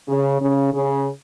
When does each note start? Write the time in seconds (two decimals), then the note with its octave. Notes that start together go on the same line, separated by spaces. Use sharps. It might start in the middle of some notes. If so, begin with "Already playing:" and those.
0.08 C#3
0.41 C#3
0.73 C#3